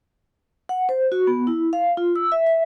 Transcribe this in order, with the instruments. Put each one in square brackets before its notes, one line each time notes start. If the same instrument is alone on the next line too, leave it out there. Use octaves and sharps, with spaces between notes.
[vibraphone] F#5
C5
F#4
B3
E4
F5
F4
E6
E5
E5